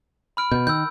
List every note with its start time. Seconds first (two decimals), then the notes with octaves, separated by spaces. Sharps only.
0.37 B5 F6 D7
0.52 B2 G6
0.67 D#3 E6 G6